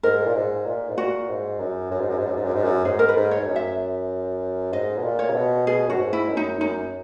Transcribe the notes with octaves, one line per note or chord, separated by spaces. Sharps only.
G#2 A#4
A#2
G#2
A#2
G#2
A#2 F#4
G#2
F#2
F#2
G#2
F#2
G#2
F#2
G#2
F#2
G#2
F#2
G#2 G#4
A#4
B4
G#2
C#5
G#2
F#2
E5
G#2 D#5
B2
A#2
C#5
C#3
B2
B2 G#4
F#2 F#4
G#2
E4
F#2
D#4
F#2 D#4